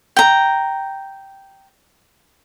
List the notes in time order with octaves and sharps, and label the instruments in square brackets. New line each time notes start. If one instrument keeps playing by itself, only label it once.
[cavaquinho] G5 A#5